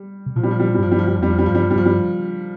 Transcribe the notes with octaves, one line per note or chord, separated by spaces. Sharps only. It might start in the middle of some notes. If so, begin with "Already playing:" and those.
Already playing: G3
C3
A#2 F3
G3
F3
G3
F3
G3
G2 F3
G3
F3
G3
F3
F2 G3
F3
G3
G2 F3
G3
F3
G3
G2 F3
G3